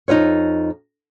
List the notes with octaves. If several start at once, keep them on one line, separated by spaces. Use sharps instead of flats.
F2 D#4 F4 B4 C#5